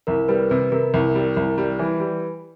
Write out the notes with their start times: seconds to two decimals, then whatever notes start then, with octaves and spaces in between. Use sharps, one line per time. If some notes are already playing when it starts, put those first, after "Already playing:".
0.07 C2 A#4
0.28 G3 B4
0.50 C3 B4
0.72 C3 A#4
0.94 C2
1.15 G3
1.37 C2
1.58 G3
1.79 E3
2.00 G3